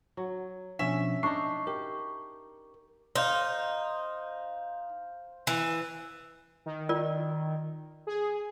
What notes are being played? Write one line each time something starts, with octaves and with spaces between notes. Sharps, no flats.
F#3
B2 F3 C#4 D4 E5
D4 D#4 C#6 C7
G4 A#4
D#4 C5 F5
E3
D#3
F4 A#4 D5
G#4